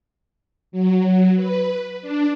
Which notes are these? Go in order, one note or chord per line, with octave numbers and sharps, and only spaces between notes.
F#3
B4
D4